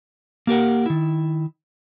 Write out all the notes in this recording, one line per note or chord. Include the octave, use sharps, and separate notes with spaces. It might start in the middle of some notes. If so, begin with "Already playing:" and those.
A#3 G4 A#4 F#5
D#3 E4